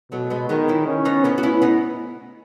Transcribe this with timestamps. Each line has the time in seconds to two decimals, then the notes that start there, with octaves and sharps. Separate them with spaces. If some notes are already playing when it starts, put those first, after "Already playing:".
0.12 B2 F#3 A3
0.30 G#3 B3
0.49 D#3 G#3 B3
0.68 C#4 E4
0.87 C#4
1.05 B3 D#4
1.24 A3 B3 C#4
1.38 F#4
1.43 C#4 E4
1.62 B3 D#4